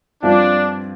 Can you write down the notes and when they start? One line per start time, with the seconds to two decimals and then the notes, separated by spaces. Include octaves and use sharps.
0.22 G2 F3 C4 D4 F4